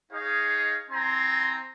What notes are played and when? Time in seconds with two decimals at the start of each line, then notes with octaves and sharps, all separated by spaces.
0.12 D#4 G#4 C#5 D#5 F5
0.91 C4 E4 G#5 A#5 C6